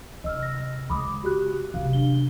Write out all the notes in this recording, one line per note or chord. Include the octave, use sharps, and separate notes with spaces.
C3 D#5 E6 F6
A#6
C#3 G#3 B5 D6 D#6
F#4 G4 F#6
C3 B3 F5
D4 G7